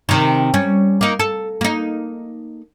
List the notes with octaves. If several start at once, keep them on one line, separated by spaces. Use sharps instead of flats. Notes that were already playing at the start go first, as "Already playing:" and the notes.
C3 D#3
G3 C#4
A#3 D#4
A4
A#3 D#4